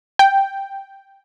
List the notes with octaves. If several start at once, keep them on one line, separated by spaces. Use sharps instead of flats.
G5